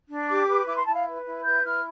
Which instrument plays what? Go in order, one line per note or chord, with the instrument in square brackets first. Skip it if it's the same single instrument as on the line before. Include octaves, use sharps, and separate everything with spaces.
[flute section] D4
G4 D6
B4
E4 D6
C6
E4 A5
F5
B4
E4
B4 G6
E4 F6